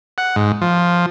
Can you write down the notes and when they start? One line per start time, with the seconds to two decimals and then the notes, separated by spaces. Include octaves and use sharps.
0.18 F#5
0.36 G#2
0.61 F3